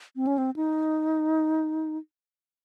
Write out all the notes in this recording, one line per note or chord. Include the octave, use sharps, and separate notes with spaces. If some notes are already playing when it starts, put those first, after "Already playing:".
C4
C#4
C4
D#4